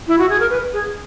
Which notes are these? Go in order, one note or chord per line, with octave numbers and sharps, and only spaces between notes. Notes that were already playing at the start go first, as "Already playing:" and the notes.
E4
F#4
G#4
A#4
B4
G#4